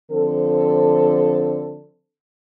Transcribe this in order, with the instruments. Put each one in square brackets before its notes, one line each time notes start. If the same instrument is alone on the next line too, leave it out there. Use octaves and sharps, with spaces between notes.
[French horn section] D3 F3 C4 A4